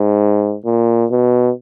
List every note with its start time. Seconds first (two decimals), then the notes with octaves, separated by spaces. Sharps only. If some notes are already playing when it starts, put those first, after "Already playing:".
Already playing: G#2
0.65 A#2
1.11 B2